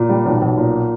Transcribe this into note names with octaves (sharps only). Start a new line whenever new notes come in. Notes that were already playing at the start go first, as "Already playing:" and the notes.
Already playing: A#2
G3
B1
B1
A#2